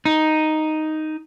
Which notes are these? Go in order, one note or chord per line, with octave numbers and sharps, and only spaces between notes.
D#4